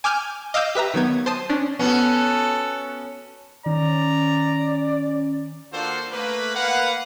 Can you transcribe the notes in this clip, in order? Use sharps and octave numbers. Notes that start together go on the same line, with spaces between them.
G#5 D6 E6 F6 G6
D#5 F5 D6 E6 G6
G4 B4 E5 A#5
D#3 F#3 B3 G#6
C5 A5 D#6
C#4 D4
B3 C#4 F#4 A4
D#3 C#4 D5 A#5
A#3 D4 F4 F#4 A4 C5
A3 A#3 B4
A#3 B4 F5 F#5